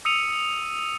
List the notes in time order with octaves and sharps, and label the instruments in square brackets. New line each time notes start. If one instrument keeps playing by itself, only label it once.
[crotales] D#6 E6 C#7 D#7 F7